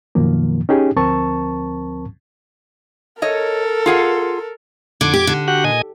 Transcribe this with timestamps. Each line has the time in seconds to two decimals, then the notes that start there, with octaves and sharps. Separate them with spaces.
0.15 F#2 B2 D#3 F3 A#3
0.69 C#4 D#4 G4 G#4
0.96 D2 F3 C4 A#4 A5 C#6
3.22 A4 A#4 C#5 D#5
3.86 F4 G#4 F#5
5.01 F2 D3 D6 G#6
5.14 G4
5.27 D3
5.48 F#4 G4 F#5
5.64 A#2 D#5 G#5